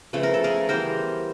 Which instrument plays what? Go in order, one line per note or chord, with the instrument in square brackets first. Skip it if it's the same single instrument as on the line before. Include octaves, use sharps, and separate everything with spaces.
[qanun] C#3 F3 A3 B4
A#4
A4
G#4 A#4
E3 G3 B3 A#4 C5